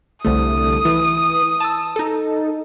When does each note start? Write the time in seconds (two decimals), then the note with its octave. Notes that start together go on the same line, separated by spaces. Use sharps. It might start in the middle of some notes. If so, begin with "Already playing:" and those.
0.25 C2 D3 A3 D#6
0.85 E3
1.60 A5 E6
1.96 D#4 A4